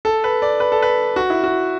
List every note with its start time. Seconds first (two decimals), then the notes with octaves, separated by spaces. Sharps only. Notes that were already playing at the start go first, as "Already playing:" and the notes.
0.05 A4
0.24 B4
0.42 D5
0.60 B4
0.72 A4
0.82 B4
1.16 F#4
1.30 E4
1.44 F#4